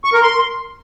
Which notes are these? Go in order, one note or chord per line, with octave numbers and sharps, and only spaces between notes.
C#6
A#4
C6